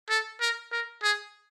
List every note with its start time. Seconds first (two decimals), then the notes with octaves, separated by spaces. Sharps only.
0.10 A4
0.41 A#4
0.72 A#4
1.03 G#4